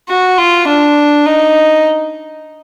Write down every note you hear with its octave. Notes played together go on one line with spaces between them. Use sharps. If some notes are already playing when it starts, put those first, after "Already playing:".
F#4
F4
D4
D#4